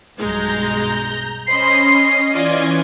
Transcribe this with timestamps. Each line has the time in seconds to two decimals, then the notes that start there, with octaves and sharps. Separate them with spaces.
0.18 B1 G2 G#3 A#5 G6
1.47 C#4 C5 D#5 B5 C6 C7
2.34 E3 C#4 F4 D5 D#5 G#6